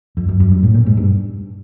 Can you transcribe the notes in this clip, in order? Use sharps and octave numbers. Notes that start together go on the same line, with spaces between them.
F2
F#2
F#2
G2
A2
A#2
G#2
G2